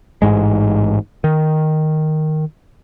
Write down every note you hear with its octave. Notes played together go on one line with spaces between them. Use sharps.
A1 G#2 G#3
D#3